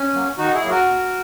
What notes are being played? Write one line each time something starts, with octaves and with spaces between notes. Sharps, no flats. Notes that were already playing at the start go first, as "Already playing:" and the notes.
Already playing: C#4
F#3 A#3
D#3 D#4 F#4
E4 G#4
F#3 A#3
F#4 A#4
B2